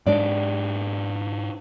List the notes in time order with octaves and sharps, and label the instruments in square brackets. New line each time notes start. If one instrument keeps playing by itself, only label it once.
[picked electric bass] G#2 G#3 D4 [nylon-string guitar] D5